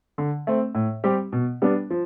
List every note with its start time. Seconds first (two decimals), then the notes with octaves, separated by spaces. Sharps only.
0.18 D3
0.47 A3 C4
0.75 A2
1.04 G3 C4 G4
1.32 B2
1.62 G3 B3 D4
1.90 F3